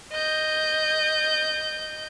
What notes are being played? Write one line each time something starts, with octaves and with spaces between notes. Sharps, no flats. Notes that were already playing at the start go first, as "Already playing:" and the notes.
D#5 G6